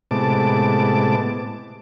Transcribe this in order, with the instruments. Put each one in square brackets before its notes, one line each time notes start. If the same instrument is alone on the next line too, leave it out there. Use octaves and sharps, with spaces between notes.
[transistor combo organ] A2 C3 G#3 B3 A5 D6